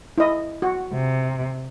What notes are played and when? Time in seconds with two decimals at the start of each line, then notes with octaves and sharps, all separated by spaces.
0.18 E4 D#5
0.62 F#4
0.94 C3